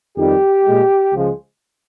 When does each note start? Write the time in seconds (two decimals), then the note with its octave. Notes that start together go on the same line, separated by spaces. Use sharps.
0.17 F2 D#3 G3 G4
0.65 A#2 G#3
1.13 C#2 C#3 F3 G#3